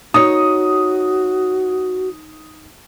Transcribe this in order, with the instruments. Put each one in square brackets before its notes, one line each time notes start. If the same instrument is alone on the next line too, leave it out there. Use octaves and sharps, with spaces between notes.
[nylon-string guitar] D#4 C#5 [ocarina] F#4 [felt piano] D#6